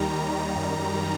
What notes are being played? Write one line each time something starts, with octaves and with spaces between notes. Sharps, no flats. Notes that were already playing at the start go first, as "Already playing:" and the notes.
Already playing: D#2 D#3 G3 A#5
F#2 D#3 G3